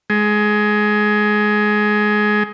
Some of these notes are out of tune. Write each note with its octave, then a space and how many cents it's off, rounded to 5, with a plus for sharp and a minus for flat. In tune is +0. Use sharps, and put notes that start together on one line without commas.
G#3 +15